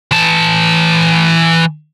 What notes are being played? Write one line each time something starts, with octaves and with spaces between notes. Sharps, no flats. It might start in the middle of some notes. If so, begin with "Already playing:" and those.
E3 A5